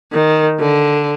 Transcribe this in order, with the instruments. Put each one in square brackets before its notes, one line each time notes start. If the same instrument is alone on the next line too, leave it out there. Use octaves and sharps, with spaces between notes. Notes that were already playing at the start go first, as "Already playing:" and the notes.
[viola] D#3
D3